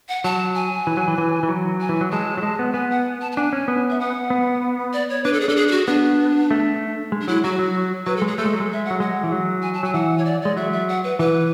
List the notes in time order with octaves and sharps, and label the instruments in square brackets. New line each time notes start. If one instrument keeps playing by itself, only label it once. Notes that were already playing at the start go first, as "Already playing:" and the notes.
[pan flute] F#5
[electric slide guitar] F#3 [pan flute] A5
[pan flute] G#5
[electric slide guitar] E3
F#3
E3
E3
E3
F#3
[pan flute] G#5
[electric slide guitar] E3
F#3
[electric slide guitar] G#3 [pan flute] A5
[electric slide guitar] F#3
G#3
B3
[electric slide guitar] B3 [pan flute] G#5
[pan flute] F#5
A5
A5
[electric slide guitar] D4 [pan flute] G#5
[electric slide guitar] C#4
B3
[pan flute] E5
F#5
[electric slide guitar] B3
[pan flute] D5
C#5
[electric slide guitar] D4 [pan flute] B4
[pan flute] A4
G#4
[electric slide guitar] D4 [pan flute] A4
[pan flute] G#4
G#4
F#4
[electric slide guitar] B3 [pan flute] D4
[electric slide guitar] A3
G#3
[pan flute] D4
[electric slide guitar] F#3 [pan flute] E4
[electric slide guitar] F#3 [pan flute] F#4
[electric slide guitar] F#3
[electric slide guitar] F#3 [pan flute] B4
[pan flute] A4
[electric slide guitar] G#3
[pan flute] G#4
[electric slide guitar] A3 [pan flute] A4
[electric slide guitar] G#3
F#3
G#3
[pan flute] E5
F#5
[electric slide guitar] F#3
[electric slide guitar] G#3 [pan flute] F#5
[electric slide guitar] E3
F#3
[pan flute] G#5
A5
[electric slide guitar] F#3 [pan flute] G#5
[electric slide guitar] E3 [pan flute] F#5
[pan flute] C#5
D5
[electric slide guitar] G#3 [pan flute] D5
[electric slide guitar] F#3 [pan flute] E5
[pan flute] E5
F#5
B4
[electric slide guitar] E3 [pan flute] B4